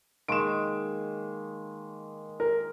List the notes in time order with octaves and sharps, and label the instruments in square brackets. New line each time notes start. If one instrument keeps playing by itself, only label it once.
[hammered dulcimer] D#3 G#3 A#3 [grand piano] D7 E7
[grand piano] A#4